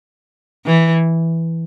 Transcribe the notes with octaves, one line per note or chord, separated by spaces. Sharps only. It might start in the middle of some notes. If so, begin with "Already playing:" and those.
E3